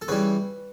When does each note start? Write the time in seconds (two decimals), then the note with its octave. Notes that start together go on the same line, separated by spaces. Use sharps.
0.02 A4
0.08 C#3 E3 G3 B4